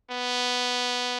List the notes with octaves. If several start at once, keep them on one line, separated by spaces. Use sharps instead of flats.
B3